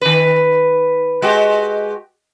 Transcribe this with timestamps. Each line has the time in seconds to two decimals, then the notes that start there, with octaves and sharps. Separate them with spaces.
0.01 D#3 B4
1.22 G#3 F#4 G4